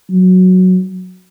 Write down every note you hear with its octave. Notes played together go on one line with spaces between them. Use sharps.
F#3